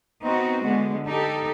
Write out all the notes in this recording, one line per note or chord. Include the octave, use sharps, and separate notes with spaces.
B3 C4 D#4 F#4
D3 G#3 B3
D#4 G4 A4